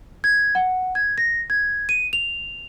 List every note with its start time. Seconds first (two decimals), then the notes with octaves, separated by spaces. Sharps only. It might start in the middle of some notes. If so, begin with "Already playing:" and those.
0.24 G#6
0.55 F#5
0.95 G#6
1.18 A#6
1.50 G#6
1.89 D#7
2.13 F7